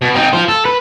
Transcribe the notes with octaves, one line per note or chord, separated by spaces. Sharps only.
B2
C4 D#4
F4 C5
A4
B4